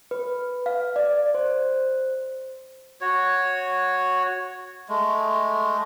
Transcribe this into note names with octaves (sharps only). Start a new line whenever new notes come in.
B4
F5
D5
C5
F#4 C#5
G#3 A3